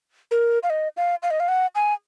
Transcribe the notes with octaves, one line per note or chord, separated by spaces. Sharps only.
A#4
F5
D#5
F5
F5
D#5
F5
F#5
G#5